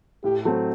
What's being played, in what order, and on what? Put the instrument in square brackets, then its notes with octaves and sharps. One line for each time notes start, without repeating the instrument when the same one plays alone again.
[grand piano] A2 [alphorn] G4
[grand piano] F#3 A3 C4